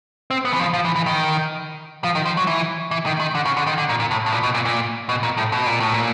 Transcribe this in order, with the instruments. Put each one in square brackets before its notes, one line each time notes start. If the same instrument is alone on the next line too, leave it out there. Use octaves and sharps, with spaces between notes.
[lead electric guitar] C4
B3
E3
F3
F3
E3
E3
D#3
F3
D#3
F3
F#3
E3
E3
D#3
D#3
D3
C#3
D3
D#3
D3
A#2
A#2
A2
A2
A#2
B2
A#2
A#2
B2
A#2
A2
B2
A#2
A2
A#2